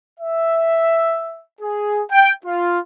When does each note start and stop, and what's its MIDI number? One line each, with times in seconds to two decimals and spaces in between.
0.20 1.43 76
1.61 2.01 68
2.10 2.32 79
2.45 2.79 65